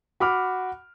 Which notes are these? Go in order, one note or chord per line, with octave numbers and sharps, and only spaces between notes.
F#4 B5 D6 F6